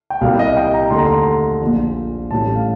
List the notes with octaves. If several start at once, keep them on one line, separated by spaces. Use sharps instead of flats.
G5
C2 A#2 G3 A#3 F5
D#5
G5
A#5
D#2 D3 A3 C6
A#5
C6
A#1 A#2 F3
A1 A2 G3 A5
F5